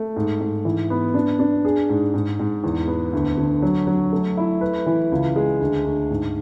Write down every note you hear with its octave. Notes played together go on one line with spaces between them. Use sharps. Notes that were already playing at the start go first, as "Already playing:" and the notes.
Already playing: A3
G#2
G#2
E3
B3
D4
D4
G#4
G#2
G#2
G#2
E2
B3
D2
D3
F#3
F#3
A3
E4
B4
E3
C#2
G#3
D2
D2
G#2